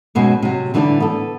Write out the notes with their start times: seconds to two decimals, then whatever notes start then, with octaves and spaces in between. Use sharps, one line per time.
0.15 F#2 B2 F#3 G#3
0.42 C3 F#3
0.74 D3 E3 G3 D4 G4
1.00 B3 A4